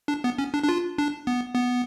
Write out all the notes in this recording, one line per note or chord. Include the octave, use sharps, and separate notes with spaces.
D4
B3
C#4
D4
D4
F4
D4
B3
B3